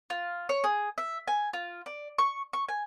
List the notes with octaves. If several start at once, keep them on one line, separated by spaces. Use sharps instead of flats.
F4
C#5
G#4
E5
G#5
F4
D5
C#6
C#6
G#5